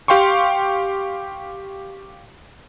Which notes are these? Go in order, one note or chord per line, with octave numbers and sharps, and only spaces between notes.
G4 F5 G5 C6 C#6